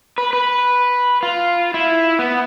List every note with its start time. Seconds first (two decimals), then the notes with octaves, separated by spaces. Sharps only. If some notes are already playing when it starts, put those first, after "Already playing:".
0.18 B4
0.33 B4
1.23 F4
1.74 E4
2.19 B3